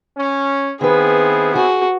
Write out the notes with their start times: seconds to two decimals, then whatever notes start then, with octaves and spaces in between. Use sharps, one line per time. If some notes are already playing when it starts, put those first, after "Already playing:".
0.17 C#4
0.81 D#3 B3 C4 E4 G#4 B4
1.55 F#4 G#4